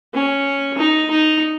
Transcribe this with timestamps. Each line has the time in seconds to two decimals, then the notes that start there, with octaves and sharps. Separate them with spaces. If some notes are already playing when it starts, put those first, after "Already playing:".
0.14 C#4
0.78 D#4
1.11 D#4